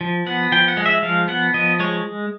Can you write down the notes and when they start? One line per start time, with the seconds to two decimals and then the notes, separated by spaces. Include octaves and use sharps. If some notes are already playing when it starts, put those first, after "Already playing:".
0.01 F3
0.26 B3 F#5
0.52 F3 G5
0.68 F#5
0.77 G#3
0.86 E5
1.03 F3 F5
1.28 B3 F#5
1.54 F3 D#5
1.80 G#3 C#5